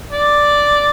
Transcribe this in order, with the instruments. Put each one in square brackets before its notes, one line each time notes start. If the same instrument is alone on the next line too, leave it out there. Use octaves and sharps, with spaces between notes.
[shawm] D5